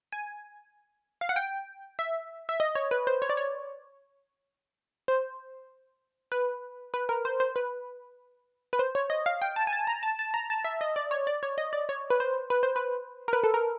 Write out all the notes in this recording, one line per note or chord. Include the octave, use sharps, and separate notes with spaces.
G#5
F5
F#5
G5
E5
E5
D#5
C#5
B4
C5
C#5
D5
C#5
C5
B4
B4
A#4
C5
C5
B4
B4
C5
C#5
D#5
F5
G5
A5
G#5
A5
A#5
A5
A5
A#5
A5
E5
D#5
D5
C#5
D5
C#5
D#5
D5
C#5
B4
C5
B4
C5
B4
A#4
B4
A4
A#4